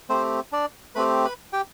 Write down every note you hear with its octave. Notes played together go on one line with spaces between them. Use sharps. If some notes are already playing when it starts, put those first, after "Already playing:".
A3 C4 G4 C5
D4 D5
A3 C4 G4 B4 B5
B4 B5
G4 G5